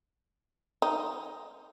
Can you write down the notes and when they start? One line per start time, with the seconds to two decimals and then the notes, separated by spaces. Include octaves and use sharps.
0.82 D#4